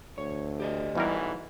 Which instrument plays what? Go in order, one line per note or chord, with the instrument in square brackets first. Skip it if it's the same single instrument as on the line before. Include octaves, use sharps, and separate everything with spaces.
[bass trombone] D2 [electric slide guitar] C#5
[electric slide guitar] G4 D5 D#5
[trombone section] B1 G#2 E3 [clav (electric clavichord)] E2 G3 A#4